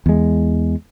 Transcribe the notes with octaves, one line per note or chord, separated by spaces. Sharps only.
E2 G#3